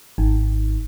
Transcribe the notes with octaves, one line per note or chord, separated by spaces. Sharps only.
G#1